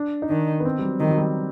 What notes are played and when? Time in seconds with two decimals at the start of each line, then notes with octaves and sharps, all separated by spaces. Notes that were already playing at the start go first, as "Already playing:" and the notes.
Already playing: D4
0.22 D#4
0.29 D#3 D4
0.60 B3
0.65 C4
0.79 G3
0.82 F#3
1.00 D#3 G3
1.09 F#3
1.18 G3